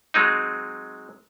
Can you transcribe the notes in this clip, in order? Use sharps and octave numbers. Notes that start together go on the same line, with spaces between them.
F#3 G#3 C4 D#4